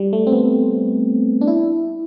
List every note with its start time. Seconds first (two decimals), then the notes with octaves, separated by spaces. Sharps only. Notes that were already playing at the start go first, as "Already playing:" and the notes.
Already playing: G3
0.13 A3
0.27 C4
0.33 B3
1.41 D4
1.47 E4